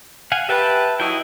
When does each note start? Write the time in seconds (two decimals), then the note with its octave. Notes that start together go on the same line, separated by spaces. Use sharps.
0.32 F5 F#5 G#5
0.49 G4 B4 E5 G5 A5
1.00 F#3 E4 D#5 G5